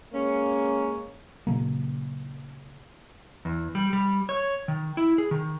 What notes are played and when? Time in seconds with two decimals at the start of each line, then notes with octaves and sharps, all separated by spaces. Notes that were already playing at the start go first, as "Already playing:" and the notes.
0.13 G#3 A#3 C#4
1.47 A#2 C#3 F#3 A#3
3.45 E2
3.75 G3
3.93 G3
4.29 C#5
4.68 D#3
4.97 E4
5.18 G#4
5.31 D#3